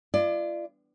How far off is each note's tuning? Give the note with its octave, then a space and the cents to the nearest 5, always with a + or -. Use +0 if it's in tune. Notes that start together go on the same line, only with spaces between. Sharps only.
F4 -40 D5 +25